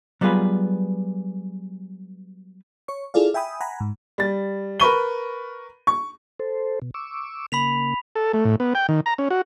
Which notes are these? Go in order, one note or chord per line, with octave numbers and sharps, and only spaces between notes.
F#3 G3 B3 F4 G#4 B4
C#5 C#6
E4 F4 G#4 A4 D5 F5
E5 G5 G#5 B5 D#6
F#5 G#5 A#5 B5
G#2
G3 A6
A#4 B4 B5 C#6 D#7 G7
C#6
A4 C5
B2
C#6 D6 E6
C#3 A#3 B5 B6 F7
A4
A3
A2
B3
G5
D#3
A#5
C#4
F#4